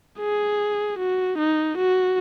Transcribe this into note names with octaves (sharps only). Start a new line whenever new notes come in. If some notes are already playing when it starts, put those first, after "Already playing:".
G#4
F#4
D#4
F#4